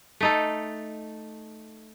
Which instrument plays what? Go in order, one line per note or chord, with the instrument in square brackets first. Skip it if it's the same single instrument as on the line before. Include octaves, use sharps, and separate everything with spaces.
[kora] A3 D#4 A4